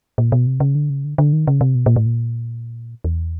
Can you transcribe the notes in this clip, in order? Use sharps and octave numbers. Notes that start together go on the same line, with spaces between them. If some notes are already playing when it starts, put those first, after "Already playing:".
A#2
B2
C3
C#3
D3
C#3
D3
D3
D#3
C#3
C3
B2
A#2
A2
A#2
E2